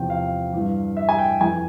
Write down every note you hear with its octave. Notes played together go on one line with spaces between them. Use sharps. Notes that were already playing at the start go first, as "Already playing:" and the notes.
Already playing: E2 C3 F3 G5
F5
G2 E3
E5
G#5
G5
F2 E3 G#5